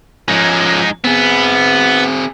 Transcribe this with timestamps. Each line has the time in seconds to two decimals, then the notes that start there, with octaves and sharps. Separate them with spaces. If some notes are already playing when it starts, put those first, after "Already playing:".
0.28 F3 G#3 C#4 D#4
1.04 B3 C4 G#4